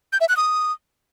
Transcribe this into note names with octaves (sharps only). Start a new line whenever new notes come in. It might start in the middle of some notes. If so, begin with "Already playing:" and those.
G6
E5
F#6
D#6